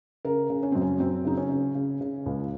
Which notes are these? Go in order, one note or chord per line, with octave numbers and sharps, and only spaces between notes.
C#3 A#4
C#3
C#4
F#2 C4
C#4
F#2 C4
C#3 D#4
C#4
C#3
C#3
C#3
C#2